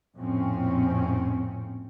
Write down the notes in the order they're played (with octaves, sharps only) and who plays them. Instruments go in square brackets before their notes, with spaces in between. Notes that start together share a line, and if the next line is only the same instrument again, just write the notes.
[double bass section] A#1 F2 A2 C4 C#4